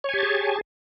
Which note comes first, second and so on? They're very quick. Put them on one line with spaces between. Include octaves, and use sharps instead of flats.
C#5 G#5 G4 A5 G#4